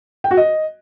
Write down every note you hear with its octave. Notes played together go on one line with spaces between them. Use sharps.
G5
F#4
D#5